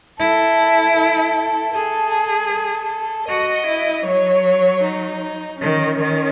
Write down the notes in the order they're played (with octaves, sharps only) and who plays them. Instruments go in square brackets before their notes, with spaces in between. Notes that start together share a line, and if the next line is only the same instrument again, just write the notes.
[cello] E4 [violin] A4
[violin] A4
[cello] G#4 [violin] A4
[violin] A4
[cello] F#4 [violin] D#5
[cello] E4
[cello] F#3 [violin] C#5
[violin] D#4
[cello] D#3 [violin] C#4
[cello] D#3